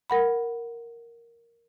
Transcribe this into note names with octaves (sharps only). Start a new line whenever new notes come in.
A#4 F#5 B5